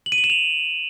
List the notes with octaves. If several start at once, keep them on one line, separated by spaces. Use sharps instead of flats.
F#7
D#7
F#7
E7
F7